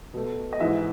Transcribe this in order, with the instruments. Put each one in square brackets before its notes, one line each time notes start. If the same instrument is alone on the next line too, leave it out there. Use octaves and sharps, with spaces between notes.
[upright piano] B2 A3
D#5
G#2 E3 G#3 E5